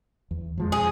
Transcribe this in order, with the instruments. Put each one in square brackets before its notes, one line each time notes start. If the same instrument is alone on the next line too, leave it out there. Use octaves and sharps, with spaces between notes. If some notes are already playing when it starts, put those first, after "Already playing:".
[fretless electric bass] E2
F2 F3 G#3
[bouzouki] G#4